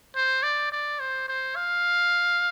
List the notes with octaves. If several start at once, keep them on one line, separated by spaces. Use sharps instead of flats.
C5
D5
D5
C5
C5
F5